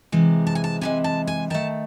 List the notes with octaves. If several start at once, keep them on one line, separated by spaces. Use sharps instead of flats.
C3 E3 G#3
A5
G#5
A5
C3 E3 G#3 G#5
A5
G#5
D#3 A3 A5